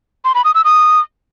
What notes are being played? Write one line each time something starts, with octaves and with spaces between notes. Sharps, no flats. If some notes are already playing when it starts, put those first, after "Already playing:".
C6
B5
D#6
E6
D#6